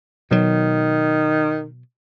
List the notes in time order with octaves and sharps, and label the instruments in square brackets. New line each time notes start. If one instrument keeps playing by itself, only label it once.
[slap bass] B2 F#3 [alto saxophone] D#3